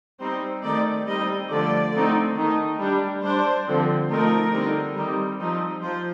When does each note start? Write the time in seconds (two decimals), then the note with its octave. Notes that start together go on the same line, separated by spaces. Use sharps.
0.20 G3 C4 D#4 C5
0.63 D#3 A3 C4 D#4 D5
1.07 G3 C4 D#4 D#5
1.50 D3 F3 A3 D5
1.93 D3 A3 C4 D#4
2.36 D#3 A3 D#4
2.79 G3 D4
3.23 G3 D4 C5
3.66 D3 F3 C4
4.09 F3 A3 C4 D#4 A#4
4.53 D3 G3 C4 D#4
4.96 D#3 G3 C4 D#4
5.39 F3 C4 D#4
5.82 F3 C5